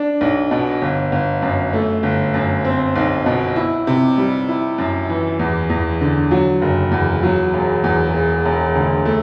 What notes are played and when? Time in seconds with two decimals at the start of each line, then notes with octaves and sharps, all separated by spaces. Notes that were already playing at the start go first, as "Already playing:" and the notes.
Already playing: D4
0.21 B1
0.51 B2
0.82 G1
1.12 G1
1.42 F#2
1.73 A3
2.03 G1
2.34 F#2
2.64 C4
2.96 B1
3.26 B2
3.56 E4
3.87 C3
4.18 G3
4.49 E4
4.78 F#2
5.09 E3
5.39 E2
5.70 E2
6.01 D3
6.31 F#3
6.62 F#1
6.92 E2
7.23 F#3
7.54 E1
7.84 E2
8.14 E1
8.46 E1
8.75 D2
9.05 A3